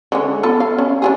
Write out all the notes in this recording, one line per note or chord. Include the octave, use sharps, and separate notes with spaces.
D3 G#3 C#4
B3 F4 A4
F5
C#4
D4 G4 G#4